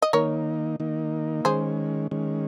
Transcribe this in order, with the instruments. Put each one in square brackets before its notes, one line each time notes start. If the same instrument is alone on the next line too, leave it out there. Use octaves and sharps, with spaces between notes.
[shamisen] D#5
[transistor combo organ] D#3 A#3 D#4 [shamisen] A#4 C#5
[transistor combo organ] D#3 A#3 D#4
[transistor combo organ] D#3 G#3 C#4 [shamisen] G#4 C5
[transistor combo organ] D#3 G#3 C#4